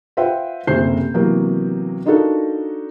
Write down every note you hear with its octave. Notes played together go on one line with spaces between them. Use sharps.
F4 B4 C5 E5 F#5 G5
F#1 D2 C3 C5 G6 C7
C3 E3 F#3 A#3 B3
D4 D#4 F4 F#4 A4 A#4